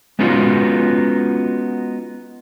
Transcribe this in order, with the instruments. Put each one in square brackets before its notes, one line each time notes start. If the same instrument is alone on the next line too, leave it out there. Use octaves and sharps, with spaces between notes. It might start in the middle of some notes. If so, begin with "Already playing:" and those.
[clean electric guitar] G#3 B3 C#4 D#4 F4 F#4